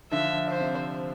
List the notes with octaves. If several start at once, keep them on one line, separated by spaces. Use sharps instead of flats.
D3 F3 E5
C5
C3